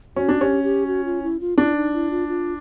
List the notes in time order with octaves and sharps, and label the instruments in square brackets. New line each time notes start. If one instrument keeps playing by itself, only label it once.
[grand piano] C#4 [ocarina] F#4
[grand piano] D4
[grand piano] C#4 [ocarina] G4
[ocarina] G4
F#4
F4
E4
F4
[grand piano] D4 [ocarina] E4
[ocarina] D#4
E4
F4
F4